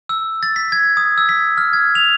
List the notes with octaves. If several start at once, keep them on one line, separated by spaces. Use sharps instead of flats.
E6
A6
B6
G#6
D#6
E6
B6
F6
G#6
F7